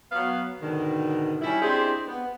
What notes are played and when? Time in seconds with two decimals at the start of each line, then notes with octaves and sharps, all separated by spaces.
0.12 F#3 B3 F5
0.62 G#2 B2 D3 D#3
1.41 G3 C#4 D4 E4
1.62 G#3 C4 D4 E4 G4 G#4
2.08 B3